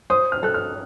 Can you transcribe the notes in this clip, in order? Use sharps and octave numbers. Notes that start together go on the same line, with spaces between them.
C5 D#6
F6
A4 F#6
F6